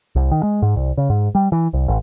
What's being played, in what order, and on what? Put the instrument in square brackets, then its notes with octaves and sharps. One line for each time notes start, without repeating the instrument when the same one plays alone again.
[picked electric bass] C2
D#3
G#3
G#2
C2
C#3
G#2
G3
E3
C2
A1